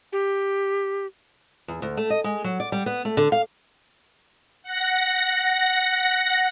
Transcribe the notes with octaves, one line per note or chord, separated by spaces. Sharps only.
G4
E2
D2
A3
D#5
G#3
F#3
D5
G3
B3
A3
D3
F5
F#5 A#6